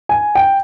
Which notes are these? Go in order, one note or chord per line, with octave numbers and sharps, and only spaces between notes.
G#5
G5